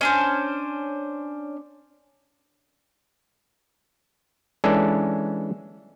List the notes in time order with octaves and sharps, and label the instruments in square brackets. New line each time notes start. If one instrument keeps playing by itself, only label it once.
[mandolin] C#4 D4 C5
[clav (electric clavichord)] E3 G#3 C#4 D4 A4 D5